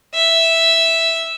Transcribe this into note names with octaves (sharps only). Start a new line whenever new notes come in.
E5